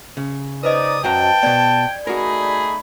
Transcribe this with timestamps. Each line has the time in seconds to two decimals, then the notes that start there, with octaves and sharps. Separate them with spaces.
0.17 C#3
0.63 D#4 B4 C5 D5 D#5 D#6
1.04 F#2 F#3 G5 A5 A#5
1.43 B2 B3 D5 G#6
2.07 A3 D#4 F#4 G#4 A#4 B5